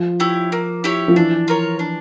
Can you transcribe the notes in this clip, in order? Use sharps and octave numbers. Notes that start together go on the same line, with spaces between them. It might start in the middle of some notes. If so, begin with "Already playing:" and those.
Already playing: F3
E4 G4 C#5
A#3
E4 G4 C#5
F3
E3 D4
F4 A#4 C#5
D4